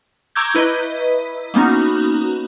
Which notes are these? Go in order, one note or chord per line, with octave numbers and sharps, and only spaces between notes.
A#5 C#6 D6 E6 G6 G#6
E4 B4 D#5
A#3 B3 C#4 D#4 F#4